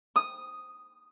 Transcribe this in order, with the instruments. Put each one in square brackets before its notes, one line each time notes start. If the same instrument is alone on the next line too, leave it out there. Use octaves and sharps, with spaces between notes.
[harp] D#6